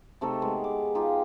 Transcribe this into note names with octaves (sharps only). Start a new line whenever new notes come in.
C3 A3 D#4 A4
G#3 B3 B4
D6
D#4 F4 G4